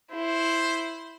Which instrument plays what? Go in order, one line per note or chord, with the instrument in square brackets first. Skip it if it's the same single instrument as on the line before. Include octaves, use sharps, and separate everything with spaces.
[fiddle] E4 [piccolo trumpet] C5